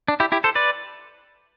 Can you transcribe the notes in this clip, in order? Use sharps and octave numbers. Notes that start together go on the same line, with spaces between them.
D4
E4 G4
E4 G4
A4 C5
B4 D5